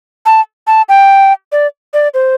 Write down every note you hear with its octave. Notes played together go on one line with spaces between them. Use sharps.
A5
A5
G5
D5
D5
C5